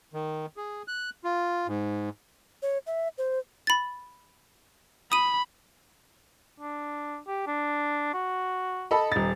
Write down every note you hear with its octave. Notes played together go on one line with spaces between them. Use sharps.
D#3
G#4
F#6
F4
G#2
C#5
E5
C5
B5 A6
B5 D#6 D#7
D4
G4
D4
F#4
A4 D#5 B5
D#1 D#4 A6